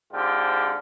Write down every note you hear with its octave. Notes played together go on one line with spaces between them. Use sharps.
G#2 D3 C4 F4 G4